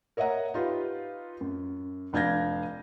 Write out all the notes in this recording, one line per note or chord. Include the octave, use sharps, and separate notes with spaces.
A#4 C#5 D#5 E5 F#5 A#5
D#4 F4 G4 B4
F#2
F1 D4 F5 G6 G#6 A#6